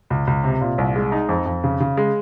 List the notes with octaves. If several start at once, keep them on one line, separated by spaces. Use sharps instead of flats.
C#2
C#2
C3
A#2
C2
G#3
D#4
F2
F2
C#3
C#3
G#3